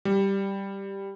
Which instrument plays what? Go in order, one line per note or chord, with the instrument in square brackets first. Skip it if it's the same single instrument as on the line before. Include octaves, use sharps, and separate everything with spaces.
[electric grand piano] G3